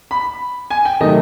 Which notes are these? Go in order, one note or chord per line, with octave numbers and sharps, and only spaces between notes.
B5
G#5
G5
C3 D#3 F#3 A3 D#5